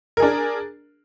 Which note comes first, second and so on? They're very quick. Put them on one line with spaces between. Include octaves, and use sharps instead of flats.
A#4 G#4 D4